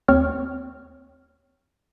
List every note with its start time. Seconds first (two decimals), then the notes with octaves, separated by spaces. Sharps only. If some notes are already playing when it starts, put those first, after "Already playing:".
0.08 D#2 C4 C#5 C#6 F6